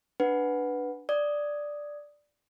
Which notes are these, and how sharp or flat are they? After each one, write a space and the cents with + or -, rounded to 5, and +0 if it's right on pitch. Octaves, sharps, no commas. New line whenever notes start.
D4 +0 B4 +0 F#5 +0
D5 +0 D#6 +0